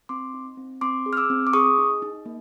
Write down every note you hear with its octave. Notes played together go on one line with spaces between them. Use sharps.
C4 C6 D6
D#4
C4
C4 C6 D6
G#4
F6
D6 E6
C4
D6
G#4 C#6 D#6
D#4
D#4
A#3